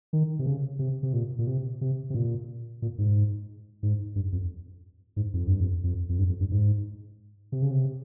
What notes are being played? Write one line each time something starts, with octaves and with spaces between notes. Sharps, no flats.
D#3
C3
C#3
C3
C3
A#2
A#2
C3
C3
C3
A#2
A#2
G#2
G#2
G2
F2
G#2
F2
G2
F2
F2
F2
G2
F2
G2
G#2
C3
C#3
C3